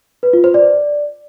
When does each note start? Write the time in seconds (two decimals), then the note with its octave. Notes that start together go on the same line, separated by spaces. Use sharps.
0.23 B4
0.33 F4
0.44 C5
0.54 D5